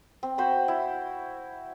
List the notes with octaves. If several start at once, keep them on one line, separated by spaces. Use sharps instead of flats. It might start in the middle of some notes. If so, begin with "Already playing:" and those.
C4
F#4 C5 B5
E4